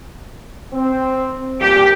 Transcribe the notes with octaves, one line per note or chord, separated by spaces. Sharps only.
C4
G2 A#2 F3 G4